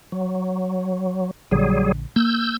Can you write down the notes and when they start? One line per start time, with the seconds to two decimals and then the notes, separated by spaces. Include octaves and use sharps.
0.12 F#3
1.51 A#1 D3 F#3 G3 G#4
2.16 A#3 E6 G6